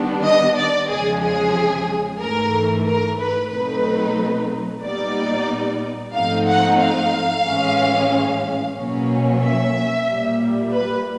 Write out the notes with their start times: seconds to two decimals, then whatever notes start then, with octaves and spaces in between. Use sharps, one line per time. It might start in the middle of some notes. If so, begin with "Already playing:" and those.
Already playing: D#3 G3 B3 D4
0.25 D#5
0.58 D5
0.90 E2 C#3 F3 G#3 G#4
1.23 G#4
2.21 G#2 E3 A3 A#4
2.87 A#4
3.20 B4
3.52 B2 F#3 A3 C4 D#4 B4
4.83 A#2 G3 B3 D#4 D5
6.14 G#2 F3 A3 C4 D#4 F5
6.47 F#5
6.80 F5
7.45 A2 E3 G#3 C#4
8.76 B2 F#3 A#3 C#4
9.42 E5
10.07 A#2 G3 A#3
10.73 B4